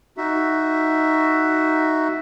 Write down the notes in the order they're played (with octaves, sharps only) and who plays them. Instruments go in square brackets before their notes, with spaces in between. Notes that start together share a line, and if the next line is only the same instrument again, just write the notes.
[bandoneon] D#4 F#4 E5